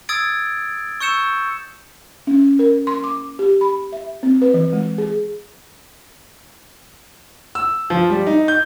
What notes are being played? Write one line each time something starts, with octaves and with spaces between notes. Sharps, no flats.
D#6 E6 G#6 A6 D7
C#6 E6 G6 C#7 E7
C#4
A#4
C6
D6
G4
B5
E5
C4
B4
E3
G#3
G#4
E6
F3
G3
D#4
G6